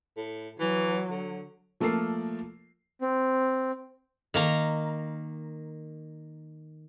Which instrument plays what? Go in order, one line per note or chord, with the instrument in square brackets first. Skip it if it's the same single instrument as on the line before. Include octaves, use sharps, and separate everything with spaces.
[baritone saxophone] A2
[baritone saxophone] E3 [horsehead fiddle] F#3
[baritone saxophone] D3
[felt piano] F3 A3 A#3 A4 A#4 C7
[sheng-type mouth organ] C4
[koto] D#3 A#3 A#5